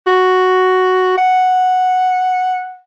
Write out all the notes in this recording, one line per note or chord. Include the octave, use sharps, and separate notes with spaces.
F#4
F#5